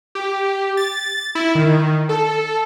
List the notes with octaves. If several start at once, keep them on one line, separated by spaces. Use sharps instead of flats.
G4
A6
E4
D#3
A4